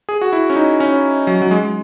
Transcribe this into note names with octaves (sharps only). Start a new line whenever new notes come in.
G#4
F#4
E4
C#4
D#4
C#4
F#3
F#3
G#3